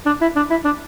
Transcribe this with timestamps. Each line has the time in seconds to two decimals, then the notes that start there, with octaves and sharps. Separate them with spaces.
0.06 D4
0.21 E4
0.36 D4
0.50 E4
0.65 D4